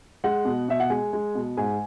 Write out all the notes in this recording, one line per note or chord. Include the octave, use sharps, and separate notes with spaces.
G#3 F#5
B2
B2 E5
F#5
G#3 G#5
G#3
B2
G#2 G#5